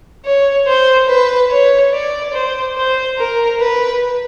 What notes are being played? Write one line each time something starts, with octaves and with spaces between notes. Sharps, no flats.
C#5
C5
B4
C#5
D5
C5
C5
A#4
B4